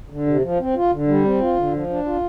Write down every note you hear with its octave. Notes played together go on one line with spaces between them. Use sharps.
D3
C3
F3
C4
F4
D3
G3
C4
F4
D3
F3
D4
F4